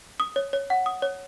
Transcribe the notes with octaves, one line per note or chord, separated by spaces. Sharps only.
D#6
C#5
C#5
F#5
D#6
C#5